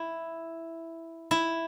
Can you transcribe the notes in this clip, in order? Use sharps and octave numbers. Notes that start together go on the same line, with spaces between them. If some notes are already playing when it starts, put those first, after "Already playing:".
Already playing: E4
E4